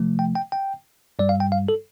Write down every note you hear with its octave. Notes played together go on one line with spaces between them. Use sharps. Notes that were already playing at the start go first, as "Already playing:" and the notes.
Already playing: C3 F3 A3
G5
G5
G5
G2 G3 D5
F5
G5
F5
A4